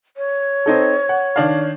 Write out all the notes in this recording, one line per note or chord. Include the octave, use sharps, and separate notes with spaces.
C#5
C4 D#4 A4
F#5
D#3 D4 F5